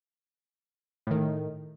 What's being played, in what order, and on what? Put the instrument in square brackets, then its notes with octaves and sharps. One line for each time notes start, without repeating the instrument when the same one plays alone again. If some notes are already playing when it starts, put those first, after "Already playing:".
[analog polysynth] A2 D#3